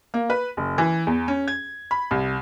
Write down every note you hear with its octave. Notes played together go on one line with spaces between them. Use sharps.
A#3
B4
F#1
E3
E2
C#4
G#6
B5
C2